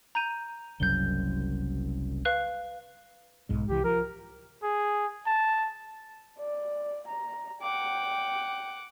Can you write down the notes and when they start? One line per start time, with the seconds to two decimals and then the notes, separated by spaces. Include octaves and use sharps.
0.15 A#5 G6 D#7
0.80 F#1 C2 F#2 G6 G7
2.25 B4 F5 F#6
3.49 B1 G#2 G#3
3.69 C2 E3 G4
3.84 F3 A#4
4.63 G#4
5.27 A5
6.39 D5
7.08 A#5
7.62 F#5 G5 D6